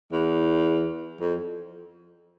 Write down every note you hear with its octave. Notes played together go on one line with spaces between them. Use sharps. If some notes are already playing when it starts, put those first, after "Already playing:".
E2
F2